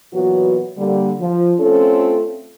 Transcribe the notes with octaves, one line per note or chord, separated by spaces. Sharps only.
A#2 E3 F#3 B3 F#4
D3 G3 A#3
F3
A3 C4 C#4 F4 A4